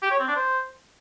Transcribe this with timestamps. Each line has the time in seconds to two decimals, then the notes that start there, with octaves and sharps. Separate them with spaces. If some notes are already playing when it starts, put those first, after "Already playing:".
0.02 G4
0.11 C#5
0.19 C4
0.28 D4
0.36 C5